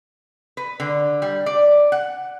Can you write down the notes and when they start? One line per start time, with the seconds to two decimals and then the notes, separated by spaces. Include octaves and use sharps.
0.57 B4
0.80 D3
1.22 G3
1.46 D5
1.92 F#5